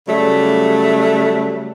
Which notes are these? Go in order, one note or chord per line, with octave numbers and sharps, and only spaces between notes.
C#3 F#3 G3 A3